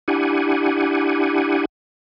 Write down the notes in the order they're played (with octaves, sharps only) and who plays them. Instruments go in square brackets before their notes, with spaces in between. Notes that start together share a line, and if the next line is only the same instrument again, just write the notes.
[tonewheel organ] D4 E4 G4 F#5 G#5